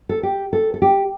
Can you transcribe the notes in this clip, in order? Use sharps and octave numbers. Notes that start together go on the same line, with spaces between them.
A4
G4
A4
A4
G4